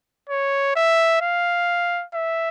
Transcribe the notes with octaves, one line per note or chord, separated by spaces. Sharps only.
C#5
E5
F5
E5